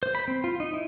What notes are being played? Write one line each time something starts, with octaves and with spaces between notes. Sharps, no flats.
C5
B5
C4
F4
D#4
E4